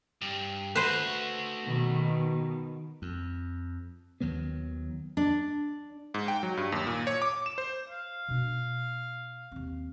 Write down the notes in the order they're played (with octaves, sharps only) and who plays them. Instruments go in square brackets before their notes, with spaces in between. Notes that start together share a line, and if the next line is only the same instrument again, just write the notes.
[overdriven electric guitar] G2
[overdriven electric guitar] A3 F#4 [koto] B4 C5
[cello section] B2 D#3
[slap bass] F2
D#2 D#3 F#3 B3
[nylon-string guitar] D4
[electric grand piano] G#2
G5
F#3
G2
D#2
A#2
C#5
D6
E7
C5
[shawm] F5
[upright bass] B2 D4
D#2 C4